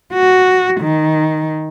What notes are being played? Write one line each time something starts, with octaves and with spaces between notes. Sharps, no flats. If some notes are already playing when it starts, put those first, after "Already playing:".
F#4
D#3